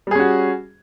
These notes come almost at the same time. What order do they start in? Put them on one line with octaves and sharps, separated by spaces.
G3 G#4 C#4 F#4